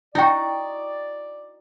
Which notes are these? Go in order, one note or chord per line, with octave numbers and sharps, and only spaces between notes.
D#4 E4 F#4 D5 G5